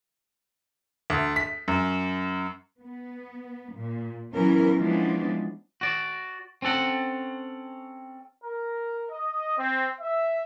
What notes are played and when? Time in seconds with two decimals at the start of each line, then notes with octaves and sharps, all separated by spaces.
1.10 D2
1.36 B6
1.68 F#2
2.81 B3
3.74 A#2
4.33 E3 F#3 B3 C#4 E4 A#4
4.77 E3 F3 G#3 B3 C#4 D4
5.81 F#4 D5
6.62 C4 C#4 A4 F#5
8.43 A#4
9.09 D#5
9.56 C4
9.99 E5